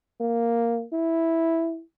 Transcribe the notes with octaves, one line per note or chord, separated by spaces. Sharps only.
A#3
E4